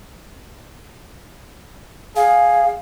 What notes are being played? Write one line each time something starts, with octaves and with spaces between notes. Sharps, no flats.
G#4 F5